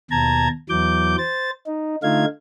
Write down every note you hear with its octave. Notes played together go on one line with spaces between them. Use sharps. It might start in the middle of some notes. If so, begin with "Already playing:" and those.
D#2 B2 A5 A#5 G#6
E2 E3 F#3 D6 G6
C5 A6
D#4
D3 A3 D#4 F4 F5 G#6